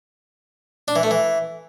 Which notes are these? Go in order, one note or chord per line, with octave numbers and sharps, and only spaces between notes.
D4
E3
A3
E3